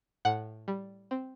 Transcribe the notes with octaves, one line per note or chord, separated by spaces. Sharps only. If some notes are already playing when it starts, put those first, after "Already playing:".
A2 F#5
G3
C4